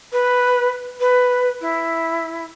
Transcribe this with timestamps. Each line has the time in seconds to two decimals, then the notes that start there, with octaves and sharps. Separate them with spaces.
0.12 B4
1.00 B4
1.61 E4